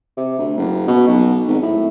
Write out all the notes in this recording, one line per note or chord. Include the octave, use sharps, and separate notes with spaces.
C3
D2
F#1
B2
B1
G#1
A2